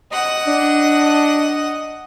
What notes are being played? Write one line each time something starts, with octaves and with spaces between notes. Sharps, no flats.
D#5 F#5
D4